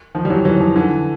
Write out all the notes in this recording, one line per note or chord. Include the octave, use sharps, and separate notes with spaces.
D#3 F3
G3
E3 F#3
E3 F#3
D#3 F3
D3 E3